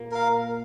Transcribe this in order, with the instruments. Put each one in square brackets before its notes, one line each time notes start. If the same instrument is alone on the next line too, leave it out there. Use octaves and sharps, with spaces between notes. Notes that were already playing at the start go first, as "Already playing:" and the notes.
Already playing: [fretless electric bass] A#2 A#3
[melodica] A#4 F5